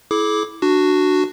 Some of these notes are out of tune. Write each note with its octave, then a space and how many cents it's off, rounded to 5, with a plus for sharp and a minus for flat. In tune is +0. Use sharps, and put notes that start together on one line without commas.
E4 +0 G#4 +45 D6 +0
D4 +15 F#4 +0